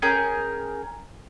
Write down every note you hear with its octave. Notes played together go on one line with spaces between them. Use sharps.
C#4 G#4 A#4 G5